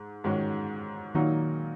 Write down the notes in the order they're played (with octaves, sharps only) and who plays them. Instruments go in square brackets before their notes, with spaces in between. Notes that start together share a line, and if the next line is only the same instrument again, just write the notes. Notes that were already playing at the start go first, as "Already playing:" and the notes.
Already playing: [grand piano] G#2
G#2 D#3 G#3 C#4 F#4
[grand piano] A#2 F#3 A#3 D#4 F#4 [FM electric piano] D#3